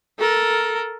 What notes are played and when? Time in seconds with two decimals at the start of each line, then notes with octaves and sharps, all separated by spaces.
0.19 A4 A#4